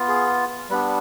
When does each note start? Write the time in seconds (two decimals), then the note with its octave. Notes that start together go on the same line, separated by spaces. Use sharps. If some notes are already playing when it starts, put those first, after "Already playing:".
Already playing: B3 F4
0.08 G#4
0.70 G3 B3 D4 B4